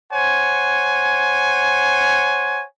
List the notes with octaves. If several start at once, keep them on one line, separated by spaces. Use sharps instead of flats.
C5 C#5 F#5 G#5